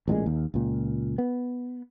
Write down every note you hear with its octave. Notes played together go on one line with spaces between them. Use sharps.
A1 G2 A#2 G#3
D#2
C#2 A#2
B3